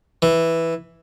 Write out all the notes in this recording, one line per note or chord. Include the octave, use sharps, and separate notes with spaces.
E3